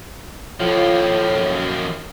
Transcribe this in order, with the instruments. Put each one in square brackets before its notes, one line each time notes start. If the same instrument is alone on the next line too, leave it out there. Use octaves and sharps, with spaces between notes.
[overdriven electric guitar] D#2 F3 [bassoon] A2 [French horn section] F4
[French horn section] F#2